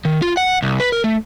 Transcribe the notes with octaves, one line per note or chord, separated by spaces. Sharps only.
D#3
F4
F#5
C2
B4
A#4
A3